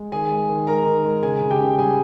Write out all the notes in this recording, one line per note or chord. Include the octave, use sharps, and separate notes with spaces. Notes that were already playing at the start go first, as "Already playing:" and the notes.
Already playing: G#3
D#3 G#4 G#5
G#3
D#3
G#3 A#4 A#5
D#3
G#3
C#3 G#4 G#5
C#3
G4 G5
C#3
G3 G#4 G#5